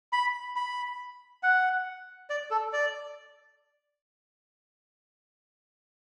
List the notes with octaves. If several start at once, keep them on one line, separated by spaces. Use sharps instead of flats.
B5
B5
F#5
D5
A4
D5